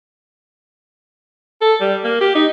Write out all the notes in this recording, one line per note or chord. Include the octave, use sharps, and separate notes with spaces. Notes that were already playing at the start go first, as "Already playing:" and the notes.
A4
G3
A#3
G4
D#4